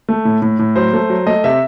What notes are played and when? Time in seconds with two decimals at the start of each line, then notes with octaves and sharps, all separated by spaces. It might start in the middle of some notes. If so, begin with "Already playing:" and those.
0.09 A3
0.25 A2
0.42 A2
0.59 A2
0.76 F#3 C5
0.93 A3
1.10 F#3
1.27 A3 D#5
1.44 C3 E5